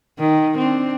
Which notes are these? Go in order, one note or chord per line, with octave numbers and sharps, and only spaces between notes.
D#3
C4 D4